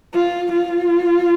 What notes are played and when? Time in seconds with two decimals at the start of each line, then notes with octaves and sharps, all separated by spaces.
0.14 F4
0.52 F4